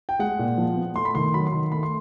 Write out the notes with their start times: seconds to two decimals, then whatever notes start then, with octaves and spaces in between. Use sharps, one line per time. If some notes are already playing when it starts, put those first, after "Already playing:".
0.09 G5
0.19 G#3 F#5
0.39 A#2
0.58 F3
0.76 B3
0.96 A3 C6
1.05 B5
1.15 D#3 C6
1.34 F#3 B5
1.47 C6
1.53 D#3
1.72 A3 B5
1.83 C6